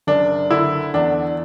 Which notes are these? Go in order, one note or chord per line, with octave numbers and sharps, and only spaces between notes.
F#1 D4
D3 E4
E2 D4